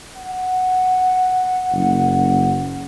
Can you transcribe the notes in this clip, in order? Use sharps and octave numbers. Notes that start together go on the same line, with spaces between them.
F#5
F#1